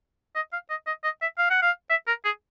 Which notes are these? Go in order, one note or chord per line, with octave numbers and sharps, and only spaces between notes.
D#5
F5
D#5
D#5
D#5
E5
F5
F#5
F5
E5
A#4
G#4